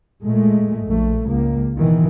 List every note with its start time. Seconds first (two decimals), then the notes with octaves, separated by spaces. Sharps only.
0.23 A#2 G#3 A3
0.85 A#1 A3
1.26 C#2 A#3
1.77 B2 D#3 E3